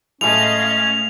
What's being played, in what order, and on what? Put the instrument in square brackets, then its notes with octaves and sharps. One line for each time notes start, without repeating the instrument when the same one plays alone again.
[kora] A2 G#3 A3 [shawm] C#4 [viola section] D#5 F5 [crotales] F7